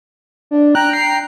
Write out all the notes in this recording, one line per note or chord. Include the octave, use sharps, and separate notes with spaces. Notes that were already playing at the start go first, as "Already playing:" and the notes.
D4
G5 A#5 F#6
C7